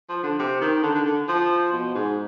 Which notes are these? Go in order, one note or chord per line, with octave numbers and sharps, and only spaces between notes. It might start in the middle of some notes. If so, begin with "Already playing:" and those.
F3
D3
C3
D#3
D3
D3
D3
F3
B2
G#2